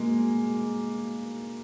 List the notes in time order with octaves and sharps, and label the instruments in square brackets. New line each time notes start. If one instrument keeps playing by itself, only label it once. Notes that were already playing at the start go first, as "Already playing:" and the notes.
Already playing: [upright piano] B2 G#3 A#3